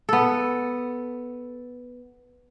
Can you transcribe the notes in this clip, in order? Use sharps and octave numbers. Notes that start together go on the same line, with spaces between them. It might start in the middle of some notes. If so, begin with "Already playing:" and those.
B3 A4